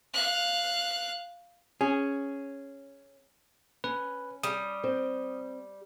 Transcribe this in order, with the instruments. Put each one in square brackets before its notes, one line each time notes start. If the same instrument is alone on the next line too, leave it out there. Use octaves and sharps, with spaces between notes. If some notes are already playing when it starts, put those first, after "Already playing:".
[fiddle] F5 F#6
[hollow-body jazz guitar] C#4 G#4
[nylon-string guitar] C#4 [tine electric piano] B4
[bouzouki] G3 [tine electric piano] D#6
[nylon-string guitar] C4 C5